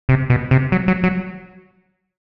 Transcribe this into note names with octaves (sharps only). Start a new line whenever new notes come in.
C3
B2
C3
F#3
F#3
F#3